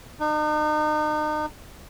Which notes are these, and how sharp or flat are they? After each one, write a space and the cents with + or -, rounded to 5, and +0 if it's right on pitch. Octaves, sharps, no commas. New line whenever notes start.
D#4 -40